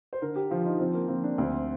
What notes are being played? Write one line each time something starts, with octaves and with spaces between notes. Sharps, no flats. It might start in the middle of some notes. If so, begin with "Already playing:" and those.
C5
D3 A#4
G4
F3 F4
D#4
F3 C4
A#3
F3 C4
D4
D2 C4